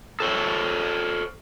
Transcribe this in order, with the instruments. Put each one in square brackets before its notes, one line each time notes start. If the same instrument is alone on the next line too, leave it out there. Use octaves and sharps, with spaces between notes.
[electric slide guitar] A4 C5 C#5